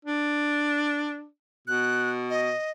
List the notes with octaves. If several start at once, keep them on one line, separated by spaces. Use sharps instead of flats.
D4
B2 F#6
D#5